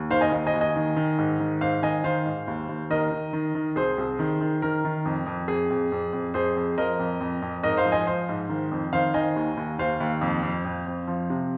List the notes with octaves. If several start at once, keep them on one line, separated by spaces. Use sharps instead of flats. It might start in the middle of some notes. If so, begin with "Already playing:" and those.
Already playing: D#2
D#3 C5 F5
D#5 G#5
D#2
D#5 G#5
D#2
D#5 G#5
D#3
D#3
G#2
D#3
G#2 C5 F5
D#3 D#5 G#5
D#3 C5 F5
G#2
D#2
D#2
D#3 A#4 D#5
D#3
D#3
D#3
C2 G#4 C5
C2
D#3
D#3
D#3 A#4
D#3
F2
F2
F2 G#4
F2
F2
F2
F2 G#4 C5
F2
F3 A#4 D#5
F2
F2
F2
G#2 A#4 D#5
C5 F5
F3
D#5 G#5
F3 C5 F5
G#2
D#3
F2
D#3 C5 F5
D#3 D#5 G#5
D#2
D#2
D#2 C5 F5
D#2
F2
F2
F2
F2
F3
C3